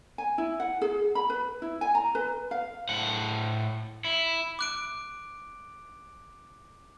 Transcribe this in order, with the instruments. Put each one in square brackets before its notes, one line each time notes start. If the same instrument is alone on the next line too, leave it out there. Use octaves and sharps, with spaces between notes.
[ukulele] G#5
E4
F#5
G#4
B5
B4
E4
G#5
A#5
B4
F5
[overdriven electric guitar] A2 F#5
E4
[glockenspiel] D6 F#6 D7